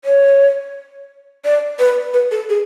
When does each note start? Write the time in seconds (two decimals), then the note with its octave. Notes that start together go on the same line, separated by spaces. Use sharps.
0.05 C#5
1.45 D5
1.79 B4
2.14 B4
2.31 A4
2.49 G#4